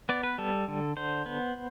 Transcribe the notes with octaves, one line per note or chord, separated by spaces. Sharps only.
B3 D5
B4
G3 A4
D3
D3 C5
B3